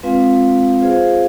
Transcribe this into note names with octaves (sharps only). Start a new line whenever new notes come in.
G#3 C4 F4 B4 F5
F4 G#4 C5 F5